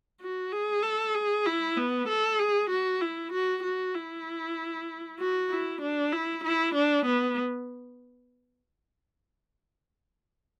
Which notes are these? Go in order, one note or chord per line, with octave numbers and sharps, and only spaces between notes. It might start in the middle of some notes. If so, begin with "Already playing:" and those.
F#4
G#4
A4
G#4
E4
B3
A4
G#4
F#4
E4
F#4
F#4
E4
F#4
E4
D4
E4
E4
D4
B3